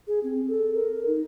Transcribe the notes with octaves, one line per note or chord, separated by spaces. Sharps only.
G#4
C4
A4
A#4
D#4